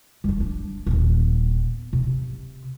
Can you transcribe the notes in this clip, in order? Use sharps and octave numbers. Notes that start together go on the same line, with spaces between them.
G3 D4
D4
D#1 B3
C3